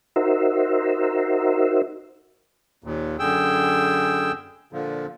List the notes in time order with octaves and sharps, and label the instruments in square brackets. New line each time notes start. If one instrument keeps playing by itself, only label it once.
[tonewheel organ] D#4 F#4 A#4 C5 E5
[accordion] D#2 A#2
F#2 D3 G#4 G5 E6
A#2 D3 F3